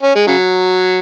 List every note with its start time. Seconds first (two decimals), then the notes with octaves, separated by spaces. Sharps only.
0.03 C#4
0.15 G#3
0.27 C#3 F#3